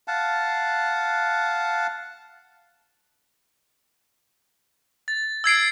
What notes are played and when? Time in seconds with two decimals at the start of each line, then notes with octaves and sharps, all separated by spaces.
0.08 F5 F#5 A5
5.08 A6
5.44 E6 G#6 C7 D7